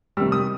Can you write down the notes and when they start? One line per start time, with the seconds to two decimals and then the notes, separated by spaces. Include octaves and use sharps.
0.17 C3 D#3 G3 E6
0.32 D#6